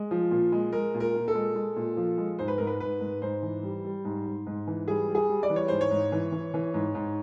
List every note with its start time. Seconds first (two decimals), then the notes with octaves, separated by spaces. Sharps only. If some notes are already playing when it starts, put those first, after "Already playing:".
Already playing: G#3
0.11 F3
0.31 A#2
0.52 G#3
0.72 G#3 A#4
0.94 A#2
1.00 A#4
1.15 A#2
1.28 A4
1.35 G#3
1.55 G#3
1.76 A#2
1.97 F3
2.18 G#3
2.39 G#2 C5
2.48 B4
2.58 G#2 A#4
2.67 B4
2.80 G#2 B4
3.01 G#2
3.22 G#2 C5
3.43 E3
3.63 G3
3.85 G3
4.05 G#2
4.26 G#2
4.47 G#2
4.67 E3
4.88 G3 G#4
5.08 G3
5.15 G#4
5.29 G3
5.43 D5
5.50 E3
5.56 C#5
5.68 G#2 C5
5.81 C#5
5.91 G#2
6.12 E3
6.32 E3
6.54 E3
6.74 G#2
6.95 G#2